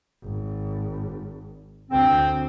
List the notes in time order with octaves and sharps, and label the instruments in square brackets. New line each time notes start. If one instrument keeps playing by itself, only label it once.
[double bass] G#1
[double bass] D2 [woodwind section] C4